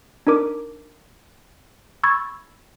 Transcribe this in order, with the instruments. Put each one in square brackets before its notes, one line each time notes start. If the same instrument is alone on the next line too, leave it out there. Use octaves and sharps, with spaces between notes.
[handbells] D4 D#4 A#4 D6
B5 C#6 E6 G#6 A6